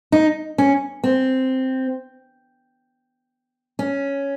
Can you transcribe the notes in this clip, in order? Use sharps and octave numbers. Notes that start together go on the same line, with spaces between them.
D#4
C#4
C4
C#4